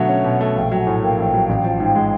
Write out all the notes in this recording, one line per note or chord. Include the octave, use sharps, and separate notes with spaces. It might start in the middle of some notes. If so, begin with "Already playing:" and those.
Already playing: B2 D3 F#3 A3 E5 F#5
C#4
B2
A3
A#1 F5 G5
F#3 G5
F#5 G#5
A2
A#3 F5 G5
A#1
F#3
A1
F3
G#2
G#3